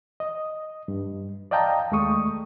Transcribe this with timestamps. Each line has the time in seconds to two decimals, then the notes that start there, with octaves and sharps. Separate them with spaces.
0.20 D#5
0.88 G2
1.51 D5 D#5 F5 G5 A5 A#5
1.92 D#2 G#3 A3 C#6 D#6